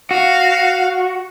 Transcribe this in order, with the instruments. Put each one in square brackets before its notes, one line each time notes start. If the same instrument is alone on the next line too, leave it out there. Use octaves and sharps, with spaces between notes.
[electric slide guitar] F#4 [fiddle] F5